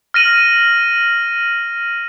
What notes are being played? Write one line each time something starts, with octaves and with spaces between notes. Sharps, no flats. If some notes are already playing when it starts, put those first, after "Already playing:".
F6 A#6 D#7 F#7